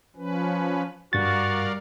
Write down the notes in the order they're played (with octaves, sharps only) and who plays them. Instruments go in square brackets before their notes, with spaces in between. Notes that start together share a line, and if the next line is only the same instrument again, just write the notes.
[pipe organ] F3 C#4 B4
[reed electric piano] G2 A6 [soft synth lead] G3 [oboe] F#4 [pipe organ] A#4 D5 F5